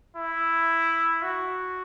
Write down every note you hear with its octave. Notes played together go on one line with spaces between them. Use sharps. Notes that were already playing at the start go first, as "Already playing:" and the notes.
E4
F#4